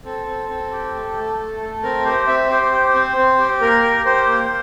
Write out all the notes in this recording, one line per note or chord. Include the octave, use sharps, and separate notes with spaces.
C4 A4
C4
C4
G4
A3
A3
A3
A3
C4 A#4
G4 C5
C4 E5
G4 C5
G4
C4
C4
G4
A#3 A#4
G4
G4 C5
A#3